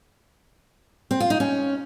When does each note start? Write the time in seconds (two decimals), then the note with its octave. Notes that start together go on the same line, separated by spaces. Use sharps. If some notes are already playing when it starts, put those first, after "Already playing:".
1.11 C4
1.20 F4
1.30 D#4
1.40 C#4